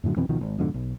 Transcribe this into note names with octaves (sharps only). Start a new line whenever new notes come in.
F#2 A2 D3 F#3
F2 B2 E3 C4
C#2 B2 D#3 F3
G#1
F2 G#2 B2 D3
B1